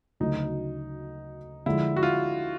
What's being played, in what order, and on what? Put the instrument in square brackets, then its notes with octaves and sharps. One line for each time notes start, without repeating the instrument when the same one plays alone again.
[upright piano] D2 C#3 F#3 A3 [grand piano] D#4
[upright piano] D3 F3 G#3 [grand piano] E4
[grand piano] F#4
F4